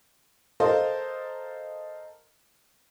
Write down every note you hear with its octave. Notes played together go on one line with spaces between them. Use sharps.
A4 A#4 C5 D#5 F5